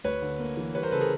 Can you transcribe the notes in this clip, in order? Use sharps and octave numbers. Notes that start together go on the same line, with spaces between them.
D2 B4 C#5
D3
A#3
E3
G3 B4 C#5
A#4 C5
C#3 A4 B4
G#4 A#4